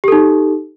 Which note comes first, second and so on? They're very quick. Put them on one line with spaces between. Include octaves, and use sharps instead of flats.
G4 A4 D#4